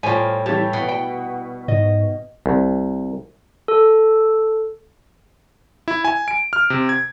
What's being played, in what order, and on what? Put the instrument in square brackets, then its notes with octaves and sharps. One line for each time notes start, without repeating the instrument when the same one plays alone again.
[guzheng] A2 G3 [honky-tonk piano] F4 C5 [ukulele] G#5
[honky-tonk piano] E3 G3 G4 [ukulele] C#5 [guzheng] A5
[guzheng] B2
[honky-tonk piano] E4 [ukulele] G5
[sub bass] G#2 [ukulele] D#5
[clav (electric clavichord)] C2
[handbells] A4
[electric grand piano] E4
G#5
D7
F6
C3
G#6